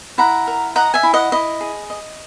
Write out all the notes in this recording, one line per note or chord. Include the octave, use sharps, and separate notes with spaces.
E4 F#5 A#5
A#4
D#5 F#5 A#5
E5 G#5
E4
D#5 F#5
E4 D#5
G#4
D#5